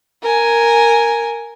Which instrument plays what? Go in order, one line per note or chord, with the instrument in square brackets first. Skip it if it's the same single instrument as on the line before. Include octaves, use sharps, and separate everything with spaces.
[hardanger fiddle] A#4 G#5